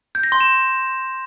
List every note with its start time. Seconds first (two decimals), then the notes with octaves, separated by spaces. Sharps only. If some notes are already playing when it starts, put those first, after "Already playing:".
0.15 G6
0.23 A#6
0.32 C6
0.41 E7